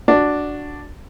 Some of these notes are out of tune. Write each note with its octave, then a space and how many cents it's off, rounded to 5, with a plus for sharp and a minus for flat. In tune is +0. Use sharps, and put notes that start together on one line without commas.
D4 +0 F#4 +0